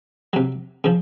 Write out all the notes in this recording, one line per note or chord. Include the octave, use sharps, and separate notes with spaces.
C3 F#3
C#3 F3